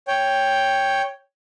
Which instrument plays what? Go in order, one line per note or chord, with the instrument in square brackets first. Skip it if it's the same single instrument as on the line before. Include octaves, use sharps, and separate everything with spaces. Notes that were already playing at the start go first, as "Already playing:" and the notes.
[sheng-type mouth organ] C#5 G5